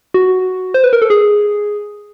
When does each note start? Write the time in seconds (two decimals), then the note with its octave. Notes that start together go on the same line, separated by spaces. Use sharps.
0.14 F#4
0.74 C5
0.84 B4
0.93 A#4
1.02 A4
1.10 G#4